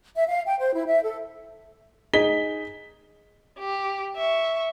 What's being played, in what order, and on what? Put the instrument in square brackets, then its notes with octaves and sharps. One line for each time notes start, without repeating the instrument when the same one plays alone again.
[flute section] E5
F5
G5
C5
E4
E5
A4
[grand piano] D#4 G#4 B6 G7
[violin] G4
E5 C#6